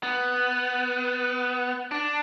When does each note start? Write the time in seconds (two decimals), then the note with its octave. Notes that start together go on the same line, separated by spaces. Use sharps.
0.03 B3
1.91 D4